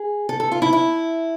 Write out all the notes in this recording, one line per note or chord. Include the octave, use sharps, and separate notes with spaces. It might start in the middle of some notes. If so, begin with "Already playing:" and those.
Already playing: G#4
A4
A4
F4
E4
E4